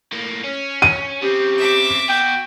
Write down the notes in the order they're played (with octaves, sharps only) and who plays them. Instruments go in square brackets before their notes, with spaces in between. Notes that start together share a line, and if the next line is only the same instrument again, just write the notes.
[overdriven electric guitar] A2 A#3
C#4
[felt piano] D#7
[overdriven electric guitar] C#3 C4 [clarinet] G4
[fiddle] E5 D6
[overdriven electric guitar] B2 F#4 [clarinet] G5